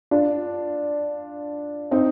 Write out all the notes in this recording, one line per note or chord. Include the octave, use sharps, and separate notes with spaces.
D4 F4
C4 D#4